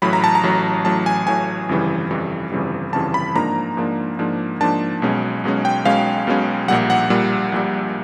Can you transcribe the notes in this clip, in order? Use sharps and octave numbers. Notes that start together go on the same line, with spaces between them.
A1 A2 F#3 B5
A#5
A5
A#5
A1 A2 F#3
A1 A2 F#3 A5
G#5
A1 A2 F#3 G#5
G1 F2 C#3 E3 G3
G1 F2 C#3 E3 G3
G1 F2 C#3 E3 G3
G1 F2 C#3 E3 G3 A5
B5
G#2 F3 A#3 D4 A#5
G#2 F3 A#3 D4
G#2 F3 A#3 D4
G#2 F3 A#3 D4 A5
B1 B2 G#3 C#4
B1 B2 G#3 C#4
G5
B1 B2 G#3 C#4 F5
B1 B2 G#3 C#4
A#1 A#2 G3 F#5
F#5
A#1 A#2 G3
A#1 A#2 G3